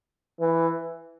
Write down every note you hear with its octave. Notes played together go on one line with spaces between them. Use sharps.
E3